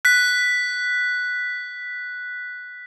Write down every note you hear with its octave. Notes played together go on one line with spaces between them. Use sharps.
F#6 B6